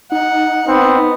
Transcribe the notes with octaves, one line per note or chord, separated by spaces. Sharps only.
D#4 F#5
B3 C4